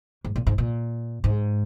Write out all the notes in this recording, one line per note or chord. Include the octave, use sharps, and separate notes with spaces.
G#2
A#2
G#2
A#2
G#2